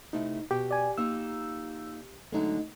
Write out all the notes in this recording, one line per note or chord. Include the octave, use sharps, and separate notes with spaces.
C3 A3 D#4 E4
B2 F#4 G4 G5
D5 G#5
A#3 D#4 F4 E6
D3 F#3 G#3 A3 D#4